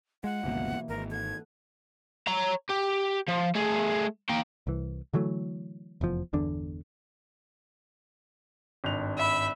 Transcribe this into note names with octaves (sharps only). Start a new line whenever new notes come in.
G#3 F4 F#5
G1 C#2 B2 E3 A#3
G#1 A#4
A4 F#5 G#6
C#5 A#5
G4
F3
A3 G#4
A#3 G5
C2 E3
D3 E3 F#3 A3
F1 E2 F3
G1 E2 D3 D4
G#1 G2 F7
E5 B5